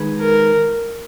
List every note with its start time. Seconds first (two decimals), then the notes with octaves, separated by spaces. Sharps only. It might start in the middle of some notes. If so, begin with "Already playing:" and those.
Already playing: D#3 G#3 D#4 G#4 B4
0.20 A#4